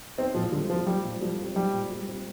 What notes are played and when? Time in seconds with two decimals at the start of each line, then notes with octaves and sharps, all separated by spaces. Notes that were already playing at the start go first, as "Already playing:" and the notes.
0.18 C4 D#4
0.34 A#2 F3
0.52 D3 G3
0.69 F3 C4
0.87 G3 D#4
1.04 A#2
1.21 F3 G3
1.38 C4
1.55 G3 D#4
1.73 A#2
1.90 G3
2.06 C4